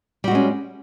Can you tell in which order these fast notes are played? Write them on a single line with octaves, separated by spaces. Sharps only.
G3 F#4 G#3 C#4